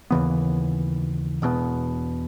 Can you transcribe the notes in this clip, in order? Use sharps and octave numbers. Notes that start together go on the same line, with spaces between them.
D#2 C#3 E3 B3
E1 E2 B2